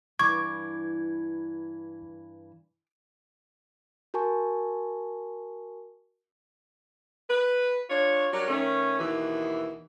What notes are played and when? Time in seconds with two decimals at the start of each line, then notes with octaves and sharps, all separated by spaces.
0.19 G2 E3 C#6 D6 G#6
4.14 F#4 A#4 G#5 A5 C#6
7.30 B4
7.90 D4 F4 C#5
8.33 F#3 G3 D4 A#4 C#5
8.48 D#3 A3 C#4
8.99 D#2 B2 E3